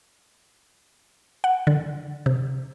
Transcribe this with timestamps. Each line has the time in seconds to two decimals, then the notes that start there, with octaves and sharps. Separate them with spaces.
1.44 F#5
1.67 D3
2.26 C3